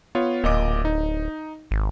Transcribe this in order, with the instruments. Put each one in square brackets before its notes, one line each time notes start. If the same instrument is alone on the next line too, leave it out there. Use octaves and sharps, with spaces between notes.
[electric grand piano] B3 F4 C#5
[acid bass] D1 [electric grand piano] A#2 D#5 D6
[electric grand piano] D#4
[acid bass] G#1